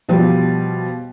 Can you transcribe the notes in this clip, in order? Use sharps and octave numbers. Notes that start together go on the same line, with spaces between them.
B2 F3 G3